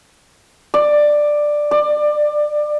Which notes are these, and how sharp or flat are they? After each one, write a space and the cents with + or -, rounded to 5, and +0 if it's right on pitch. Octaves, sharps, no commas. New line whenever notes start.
D5 +10
D5 +25